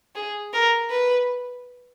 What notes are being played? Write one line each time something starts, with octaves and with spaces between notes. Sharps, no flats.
G#4
A#4
B4